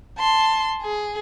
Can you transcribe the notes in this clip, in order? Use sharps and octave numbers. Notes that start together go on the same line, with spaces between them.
A5 C6
G#4